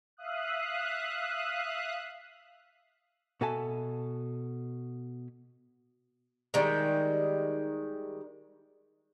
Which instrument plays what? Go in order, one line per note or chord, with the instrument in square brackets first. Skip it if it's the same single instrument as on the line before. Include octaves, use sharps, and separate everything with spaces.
[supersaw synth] E5 F5 D#6 F#6
[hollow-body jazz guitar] B2 F#4 A4 E5 G#5 A5
[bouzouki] D#3 G3 G#3